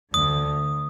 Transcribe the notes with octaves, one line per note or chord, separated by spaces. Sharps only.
D2 D3 D#6